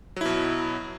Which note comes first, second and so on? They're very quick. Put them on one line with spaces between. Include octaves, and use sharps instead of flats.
F#3 E4 B2